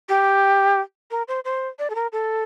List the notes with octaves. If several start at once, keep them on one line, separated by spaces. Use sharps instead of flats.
G4
A#4
C5
C5
D5
A4
A#4
A4